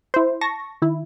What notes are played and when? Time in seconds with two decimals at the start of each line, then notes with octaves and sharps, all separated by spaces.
0.14 E4 C5
0.41 A5 C#6 A#6
0.82 D#3 E4